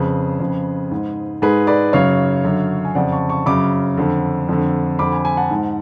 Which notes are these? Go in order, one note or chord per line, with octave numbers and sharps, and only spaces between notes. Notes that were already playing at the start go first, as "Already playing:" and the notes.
Already playing: F2 C#3 G#4 B4
F2 C#3
G#2
G#2 G#4 B4
B4 D5
F#2 C#3 C#5 F5
F#2 D3
G#5
F2 C#3 D5 F#5
A5 C#6
A5 C#6
F#2 C#3 B5 D6
F2 D3
F2 D3
F2 D3 B5 D6
G#5 B5
G#5 B5
F#5 A5
G#2